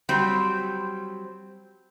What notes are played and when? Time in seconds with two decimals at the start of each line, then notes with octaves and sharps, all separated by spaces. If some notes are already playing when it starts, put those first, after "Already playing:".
0.09 F#3 G3 C4